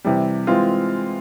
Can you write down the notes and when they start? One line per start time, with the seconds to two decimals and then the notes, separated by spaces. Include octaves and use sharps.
0.04 C3 E3 G3
0.47 E3 G#3 C4 F4